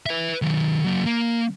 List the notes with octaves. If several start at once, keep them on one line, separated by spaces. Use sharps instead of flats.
B4 E5
D#3 F#3
F#3 A#3
A#3